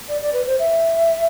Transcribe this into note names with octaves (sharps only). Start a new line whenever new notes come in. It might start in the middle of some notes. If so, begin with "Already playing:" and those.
D5
D5
B4
C5
E5